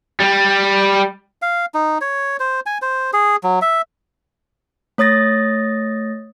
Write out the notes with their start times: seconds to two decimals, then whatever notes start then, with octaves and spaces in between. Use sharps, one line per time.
0.20 G3
1.42 F5
1.74 D#4
2.01 C#5
2.40 C5
2.66 G#5
2.82 C5
3.13 G#4
3.44 F#3
3.62 E5
4.98 A3 C#5 D#6 A6 A#6